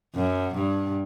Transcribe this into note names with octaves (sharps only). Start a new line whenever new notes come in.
F#2
G2